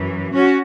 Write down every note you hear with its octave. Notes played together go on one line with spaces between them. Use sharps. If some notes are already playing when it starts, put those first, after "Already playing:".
Already playing: F#2 E3
C#4 F#4